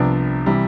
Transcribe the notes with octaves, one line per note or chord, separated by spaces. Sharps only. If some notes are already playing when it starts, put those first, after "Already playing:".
Already playing: C2 C3 F3 B3 D4
C3 E3 G3